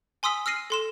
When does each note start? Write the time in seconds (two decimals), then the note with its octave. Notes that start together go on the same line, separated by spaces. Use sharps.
0.23 G#5 C6 D#6 E6 B6
0.46 E6 F6 A#6 C7 D#7
0.70 A4 C6 E7